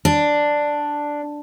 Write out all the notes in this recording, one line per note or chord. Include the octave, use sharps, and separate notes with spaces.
D4